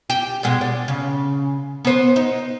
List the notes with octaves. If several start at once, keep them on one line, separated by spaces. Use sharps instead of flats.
G4
G2 B2 G#3
D5
C#3
B3 C5
D#4